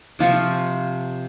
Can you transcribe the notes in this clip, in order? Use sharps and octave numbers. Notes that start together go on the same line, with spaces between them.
C3 F3 F4 C#6